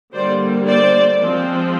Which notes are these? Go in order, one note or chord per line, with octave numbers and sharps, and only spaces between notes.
D3 G3 A#3 C5 D5
C5 D5
F3 G#3 C4